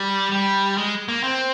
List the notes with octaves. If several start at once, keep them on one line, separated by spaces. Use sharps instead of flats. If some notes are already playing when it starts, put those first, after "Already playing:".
Already playing: G3
G3
G#3
A#3
C4